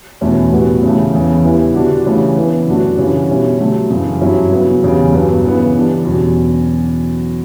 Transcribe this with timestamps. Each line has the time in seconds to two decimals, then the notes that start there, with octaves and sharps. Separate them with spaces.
0.21 E2 B2 A3 C#4 E4
0.52 A2 G3 B3 F#4
0.83 C#3 E3 A3
1.14 E2 C#3 E3
1.45 E3 G3 B3 E4
1.75 D3 G3 D4 F#4
2.06 C#3 E3 A3 C#4
2.36 E3 B3 E4
2.67 F#2 D3 A3 D4 F#4
2.98 C#3 E3 G3 C#4
3.29 B2 G3 C#4 E4
3.59 D3 F#3 A3
3.90 F#2 C#3 E3
4.21 G2 F#3 C#4 E4
4.52 C#3 F#3 B3 E4
4.83 E2 C#3 G3
5.12 G2 F#3 B3
5.44 C#3 E3 B3
5.74 E3 G3 D4
6.05 E2 B2 F#3 C#4